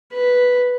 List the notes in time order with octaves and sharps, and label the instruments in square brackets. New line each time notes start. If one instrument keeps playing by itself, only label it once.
[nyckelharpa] B4